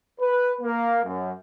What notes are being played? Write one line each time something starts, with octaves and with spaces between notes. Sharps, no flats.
B4
A#3
F#2